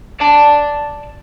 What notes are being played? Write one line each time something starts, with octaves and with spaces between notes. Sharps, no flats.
D5 A5